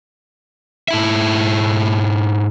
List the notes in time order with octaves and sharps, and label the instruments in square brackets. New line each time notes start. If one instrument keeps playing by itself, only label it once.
[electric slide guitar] G#2 E4 E5